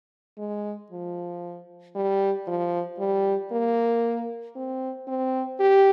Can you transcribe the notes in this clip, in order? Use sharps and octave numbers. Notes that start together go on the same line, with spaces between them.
G#3
F3
G3
F3
G3
A#3
C4
C4
G4